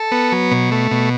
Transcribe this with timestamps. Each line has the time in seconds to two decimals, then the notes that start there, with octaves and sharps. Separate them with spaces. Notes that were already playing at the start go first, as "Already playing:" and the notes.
Already playing: A4
0.12 B3
0.32 F#3
0.51 B2
0.72 A3
0.91 B2